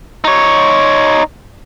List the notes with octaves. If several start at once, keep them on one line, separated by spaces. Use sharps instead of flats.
D#4 C#5